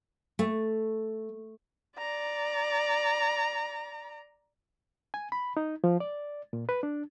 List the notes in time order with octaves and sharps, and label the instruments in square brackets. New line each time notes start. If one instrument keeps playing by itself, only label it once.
[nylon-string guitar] A3
[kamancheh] D5 A#5
[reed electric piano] G#5
B5
D#4
F3
D5
A#2
B4
D4